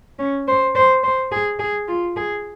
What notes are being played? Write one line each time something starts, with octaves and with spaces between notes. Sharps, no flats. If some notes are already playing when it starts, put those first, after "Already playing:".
C#4
C5
C5
C5
G#4
G#4
F4
G#4